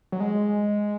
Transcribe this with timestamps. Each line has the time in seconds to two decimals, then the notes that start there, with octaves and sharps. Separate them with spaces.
0.12 F#3
0.20 G#3